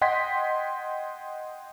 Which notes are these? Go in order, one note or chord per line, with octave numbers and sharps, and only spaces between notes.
D#5 F#5 G5 C6 G#6 B6